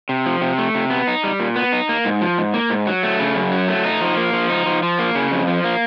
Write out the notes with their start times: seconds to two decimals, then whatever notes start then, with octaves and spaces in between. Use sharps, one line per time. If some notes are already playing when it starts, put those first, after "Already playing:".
0.09 C3
0.26 F3
0.41 C3
0.58 A3
0.75 C3
0.90 B3
1.07 D#4
1.24 G3
1.40 A#2
1.56 B3
1.72 D#4
1.89 A#3
2.05 G#2
2.21 F3
2.38 G#2
2.54 A#3
2.70 G#2
2.87 F#3
3.03 A3
3.19 C#3
3.36 F#2
3.52 F#3
3.68 A3
3.85 D#4
4.01 F3
4.17 A#3
4.33 F3
4.49 D#4
4.66 F3
4.83 F3
4.99 A#3
5.15 C#3
5.31 F2
5.47 F3
5.64 A#3